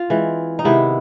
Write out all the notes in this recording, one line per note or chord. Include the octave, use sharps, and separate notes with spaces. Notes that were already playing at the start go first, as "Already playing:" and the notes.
Already playing: F4
E3 G#3 C4
D#4
C3 D#3 G#3 B3 E4